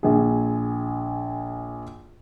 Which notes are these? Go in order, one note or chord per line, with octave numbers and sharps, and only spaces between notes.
A#1 G#4